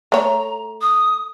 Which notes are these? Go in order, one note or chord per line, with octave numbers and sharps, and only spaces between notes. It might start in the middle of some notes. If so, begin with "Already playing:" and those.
A3 C#5 A#5
D#6